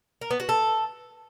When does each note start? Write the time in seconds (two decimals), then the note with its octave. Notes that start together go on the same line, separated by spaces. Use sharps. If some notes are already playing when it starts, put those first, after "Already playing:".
0.21 A#4
0.31 B3
0.40 F#4
0.49 A4